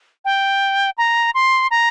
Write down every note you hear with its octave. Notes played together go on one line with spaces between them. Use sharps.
G5
A#5
C6
A#5